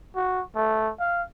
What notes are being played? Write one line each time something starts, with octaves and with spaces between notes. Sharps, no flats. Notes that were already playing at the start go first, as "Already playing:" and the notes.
F#4
A3
F5